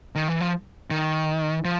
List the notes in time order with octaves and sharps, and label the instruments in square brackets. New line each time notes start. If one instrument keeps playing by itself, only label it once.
[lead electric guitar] D#3
E3
F3
D#3
F3